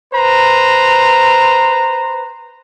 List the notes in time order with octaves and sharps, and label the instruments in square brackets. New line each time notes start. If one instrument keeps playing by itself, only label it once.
[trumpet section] B4 C5 A#5